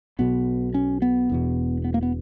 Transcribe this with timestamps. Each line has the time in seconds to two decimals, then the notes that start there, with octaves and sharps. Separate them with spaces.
0.19 B1 B2 B3
0.74 C#4
1.02 B3
1.30 E1 E2 B2
1.85 B3
1.94 A#3
2.03 B3